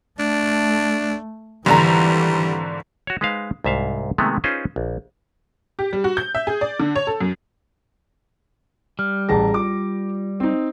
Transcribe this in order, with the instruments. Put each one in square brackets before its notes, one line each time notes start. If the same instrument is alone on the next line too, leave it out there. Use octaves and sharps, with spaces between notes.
[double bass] A3 [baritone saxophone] D4
[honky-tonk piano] G#1 D3 A#5 [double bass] E3 [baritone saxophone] G3
[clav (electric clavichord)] F#4 C#5
G#3 D#4 B4 C5 F5
C2 G#2 E5 F5
C3 D#3 F#3 G#3 A3 B3
C#4 D#4 F4 G#4 B4 C5
A#1
[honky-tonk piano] G4
G3
F#4
G6
E5
G#4
D5
D3
C#5
A4
F#2
[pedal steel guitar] G3 [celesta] F6
[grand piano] A1 A5 A#6 [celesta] G#4 A#5
[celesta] F4 [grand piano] D6
[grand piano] C4 D#4